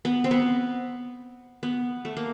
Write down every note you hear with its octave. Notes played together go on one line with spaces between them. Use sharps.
B3
C4
B3
B3
A3
A#3